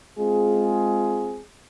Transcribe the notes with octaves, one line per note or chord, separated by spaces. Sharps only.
G#3 C4 F4 G#4